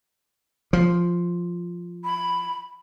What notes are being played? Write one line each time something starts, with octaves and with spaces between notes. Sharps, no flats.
F3
B5